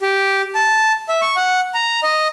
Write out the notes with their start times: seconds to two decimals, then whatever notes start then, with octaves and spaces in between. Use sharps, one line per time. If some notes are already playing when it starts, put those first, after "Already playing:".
0.01 G4
0.55 A5
1.09 E5
1.22 C#6
1.36 F#5
1.74 A#5
2.03 D#5